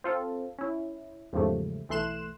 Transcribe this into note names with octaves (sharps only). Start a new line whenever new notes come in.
C4 F4 A4
C#4 E4
E2 G#2 C#3 F3 G3 A3
B1 E3 A3 C6 F#6 E7